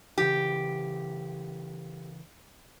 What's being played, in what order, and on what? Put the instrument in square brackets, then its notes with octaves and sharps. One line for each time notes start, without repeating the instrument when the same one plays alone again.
[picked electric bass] C#3 E3 [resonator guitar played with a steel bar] G4